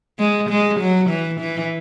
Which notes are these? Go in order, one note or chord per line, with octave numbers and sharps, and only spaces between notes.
G#3
G#3
F#3
E3
E3